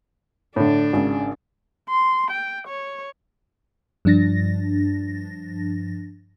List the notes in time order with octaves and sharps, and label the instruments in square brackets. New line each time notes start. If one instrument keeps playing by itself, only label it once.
[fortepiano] A2 D3 [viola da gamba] D4
[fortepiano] G#1 C#3
[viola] C6
G5
C#5
[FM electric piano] G2 F3 D4 A6 A#6